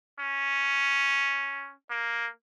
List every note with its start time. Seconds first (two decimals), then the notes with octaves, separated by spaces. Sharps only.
0.20 C#4
1.90 A#3